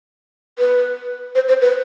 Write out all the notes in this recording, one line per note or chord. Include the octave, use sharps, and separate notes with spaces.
B4
C5
C5
B4